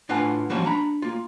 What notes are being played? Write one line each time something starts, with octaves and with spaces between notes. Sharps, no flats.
A2 D4 F4 B4 F#5 G#5
E3 F3 G3 A#3 C#4 F#4
D4 A#5 B5
A#3 F4